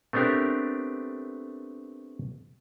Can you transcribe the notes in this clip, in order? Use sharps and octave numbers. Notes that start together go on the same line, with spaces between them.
A3 B3 C4 D4 G4 A#4